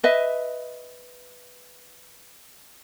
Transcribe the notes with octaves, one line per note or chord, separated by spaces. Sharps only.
B4 D#5 E5